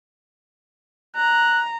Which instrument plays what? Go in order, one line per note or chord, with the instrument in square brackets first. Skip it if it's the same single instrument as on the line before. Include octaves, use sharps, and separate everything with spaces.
[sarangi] A#5 [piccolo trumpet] F#6